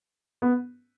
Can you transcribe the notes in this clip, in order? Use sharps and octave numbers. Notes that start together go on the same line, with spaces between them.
B3